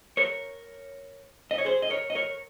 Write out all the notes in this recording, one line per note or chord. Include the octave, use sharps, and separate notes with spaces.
A#4 C#5
D#5
C#5
G#4 C5
D#5
A#4 C#5
D#5
A#4 C#5